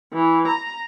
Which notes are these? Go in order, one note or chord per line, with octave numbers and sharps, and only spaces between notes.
E3
A#5